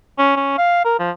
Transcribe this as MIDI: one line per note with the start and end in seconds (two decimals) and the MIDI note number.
0.19 0.32 61
0.36 0.56 61
0.58 0.82 77
0.85 0.95 70
1.00 1.11 53